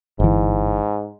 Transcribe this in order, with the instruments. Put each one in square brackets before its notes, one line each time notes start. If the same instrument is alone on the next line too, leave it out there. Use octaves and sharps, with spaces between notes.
[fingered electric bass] G1 E3 [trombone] G#2